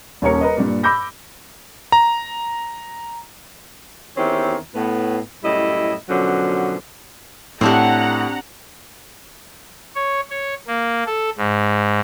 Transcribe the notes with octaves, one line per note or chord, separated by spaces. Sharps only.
D#1 D#2 C#4 A#4 C#5 C#7
A#4 B4 D#5
G2 A#2
B5 D6 E6 G6 A#6
A#5
E2 D#3 C4 C#4 G4 E5
A2 B3
F#2 A2 G3 E4 D#5
F#2 B2 D3 F3 F#3
A2 C4 D4 G4 F#5 A#5
C#5
C#5
A#3
A4
G#2